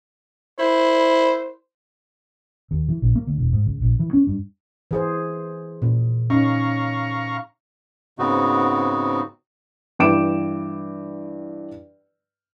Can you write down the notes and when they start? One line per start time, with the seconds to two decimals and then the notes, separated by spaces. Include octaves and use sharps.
0.59 E4 C5
2.71 D#2
2.89 E3
3.02 A#1
3.15 A#3
3.27 D2
3.38 E1
3.53 G#2
3.66 C#2
3.82 A#1
3.99 E3
4.13 C#4
4.27 G2
4.91 E3 G#4 C5
5.82 A#2
6.30 C#4 D#4 F5 A#5 C#6
8.19 G#2 C#3 B3 C4 D#4 F#4
9.99 G2 E3 G5 D6 D7 E7